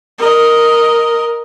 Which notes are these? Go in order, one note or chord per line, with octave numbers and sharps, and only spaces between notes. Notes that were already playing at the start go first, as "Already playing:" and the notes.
A#4 D#5